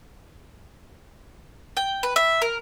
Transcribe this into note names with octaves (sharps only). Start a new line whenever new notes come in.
G5
B4
E5
A#4